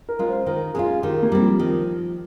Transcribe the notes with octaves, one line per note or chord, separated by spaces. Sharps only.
A#4
G#3 C#4 F4
C5
D#3 A#4
G#3 C#4 F4 G#4
D#3 G4
A#3
G3 C4
F3
D#3